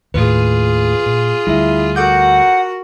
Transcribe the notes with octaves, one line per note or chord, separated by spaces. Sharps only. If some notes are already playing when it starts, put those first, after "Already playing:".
D#2 A2 F4 G#4 B4
A#2
D2 G3 E4 E5
F#4 A4 A#4 F#5 D6 G6